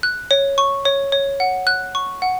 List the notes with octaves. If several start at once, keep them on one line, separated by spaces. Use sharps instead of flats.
F#6
C#5
C#6
C#5
C#5
F#5
F#6
C#6
F#5